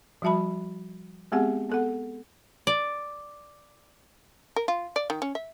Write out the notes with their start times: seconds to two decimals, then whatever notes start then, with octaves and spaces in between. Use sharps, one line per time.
0.22 F3 G3 F#4 E5 A5 B5
1.32 G#3 B3 C4 G4 G#4 F#5
1.69 B3 A4 F#5
2.67 D5
4.56 A#4
4.68 F4
4.96 D5
5.10 D#3
5.22 C#4
5.35 E5